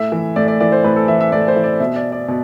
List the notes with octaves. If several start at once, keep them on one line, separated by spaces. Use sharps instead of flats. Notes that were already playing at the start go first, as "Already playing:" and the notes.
Already playing: A2 E5
E3
A2 D5
D5
E3 D5
C5
A2 B4
A4
E3 E5
E5
A2 D5
C5
E3
D5
B2 E5
D5
D5
B2